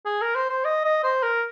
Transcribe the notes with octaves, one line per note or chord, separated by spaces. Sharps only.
G#4
A#4
C5
C5
D#5
D#5
C5
A#4